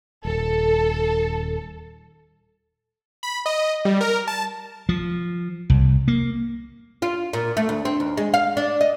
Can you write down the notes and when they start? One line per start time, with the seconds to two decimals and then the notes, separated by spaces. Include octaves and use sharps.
0.25 D#1 A4
3.23 B5
3.46 D#5
3.85 G3
4.01 A#4
4.28 A5
4.89 F3
5.70 C2
6.08 A#3
7.02 F4
7.33 A#2
7.57 A3
7.69 D2
7.85 C4
8.00 D#2
8.17 G#3
8.34 F5
8.57 D4
8.81 D#5